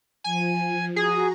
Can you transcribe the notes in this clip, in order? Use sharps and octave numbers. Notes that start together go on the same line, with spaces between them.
F3 G#5
F#4 G#4 A#5